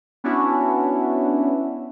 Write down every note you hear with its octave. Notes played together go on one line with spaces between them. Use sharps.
B3 C#4 D4 E4 F#4